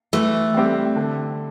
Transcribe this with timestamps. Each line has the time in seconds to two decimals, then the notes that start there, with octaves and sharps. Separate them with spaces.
0.13 E3 A3
0.54 G3 C4 G4
0.96 D3